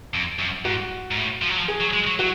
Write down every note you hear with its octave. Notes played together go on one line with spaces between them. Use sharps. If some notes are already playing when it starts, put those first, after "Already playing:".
F2
F#2
G#2 F#4
G#2
A2
F3
F#3
F3
G#4
F#3
G#3
F#3
F#3 F#4